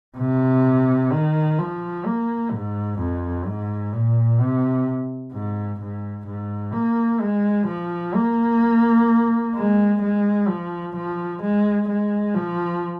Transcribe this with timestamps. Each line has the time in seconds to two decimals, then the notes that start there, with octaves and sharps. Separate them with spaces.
0.18 C3
1.12 D#3
1.58 F3
2.05 A#3
2.52 G#2
2.99 F2
3.46 G#2
3.93 A#2
4.40 C3
5.33 G#2
5.80 G#2
6.26 G#2
6.74 A#3
7.21 G#3
7.67 F3
8.15 A#3
9.55 G#3
10.01 G#3
10.48 F3
10.96 F3
11.42 G#3
11.88 G#3
12.35 F3